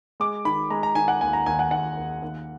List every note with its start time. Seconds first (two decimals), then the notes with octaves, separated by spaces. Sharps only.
0.20 G#3 D6
0.45 D#3 B5
0.70 G#3 A#5
0.83 A#5
0.95 D#3 G#5
1.08 F#5
1.21 D#2 G#5
1.33 A#5
1.46 D#2 G#5
1.59 F#5
1.71 D#2 F#5
1.97 D#2
2.22 D#2